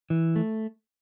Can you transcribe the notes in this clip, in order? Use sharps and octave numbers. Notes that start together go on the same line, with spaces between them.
E3
A3